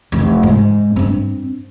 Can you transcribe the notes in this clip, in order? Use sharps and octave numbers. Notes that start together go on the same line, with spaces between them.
F1 E3
G#2
G2 C4